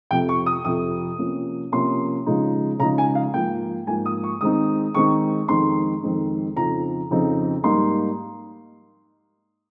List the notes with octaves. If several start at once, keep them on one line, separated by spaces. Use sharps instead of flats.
F2 C3 F3 G5
C#6
D#6
F2 C3 F3 D#6
C3 F3 A#3 C#4
C3 F3 A#3 C#4 C6
C#3 F3 G#3 D#4
C#3 F3 G#3 D#4 A#5
G#5
F5
G#2 F3 A#3 G5
G#2 F3 A#3 G#5
D#6
C#6
D#3 G#3 C4 D#4 D#6
D#3 G#3 C4 D#4 C#6
F2 D#3 G#3 C4 D#4 C6
F2 D#3 G#3 C4 D#4
F2 C#3 F3 C4 D#4 A#5
F2 C#3 F3 C4 D#4
G#2 G3 A#3 D#4 C6